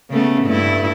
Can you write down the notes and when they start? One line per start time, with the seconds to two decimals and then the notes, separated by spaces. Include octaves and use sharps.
0.11 C#3 A3 B3
0.45 G2 A3 E4